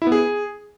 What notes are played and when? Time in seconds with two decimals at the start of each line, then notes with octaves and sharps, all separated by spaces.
0.02 E4
0.07 B3
0.12 G#4